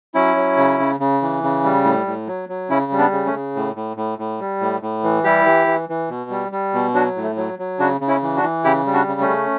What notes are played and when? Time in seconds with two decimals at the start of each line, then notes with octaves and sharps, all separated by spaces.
0.14 F#3 C#4 E4
0.36 F#3
0.57 C#3
0.79 C#3
1.00 C#3
1.22 E3
1.43 C#3
1.64 G3
1.84 A2
2.06 A2
2.27 F#3
2.49 F#3
2.70 C#3 C#4 E4
2.92 G3
2.98 B3 D4
3.12 C#3
3.26 A3 C#4
3.34 C#3
3.55 A2
3.76 A2
3.97 A2
4.18 A2
4.40 G3
4.60 A2
4.82 A2
5.04 E3
5.24 G3 E4 G4
5.45 E3
5.67 E3
5.89 E3
6.09 B2
6.30 G3
6.52 G3
6.74 B2
6.94 F#3 D4 F#4
7.16 A2
7.23 A3
7.37 F#3
7.59 F#3
7.79 C#3 D4 F#4
8.01 C#3
8.08 C#4 E4
8.22 E3
8.36 D4 F#4
8.43 E3
8.64 C#3 E4 G4
8.86 G3
8.93 D4 F#4
9.07 C#3
9.21 A3 C#4
9.28 C#3